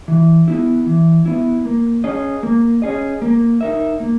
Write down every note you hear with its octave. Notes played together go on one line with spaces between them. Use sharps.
E3
B3 E4
E3
B3 E4
A#3
C#4 G#4 D#5
A#3
C#4 G#4 D#5
A#3
D#4 A#4 E5
A#3